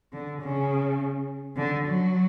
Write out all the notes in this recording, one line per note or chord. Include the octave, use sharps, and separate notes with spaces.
D3
C#3
D3
F#3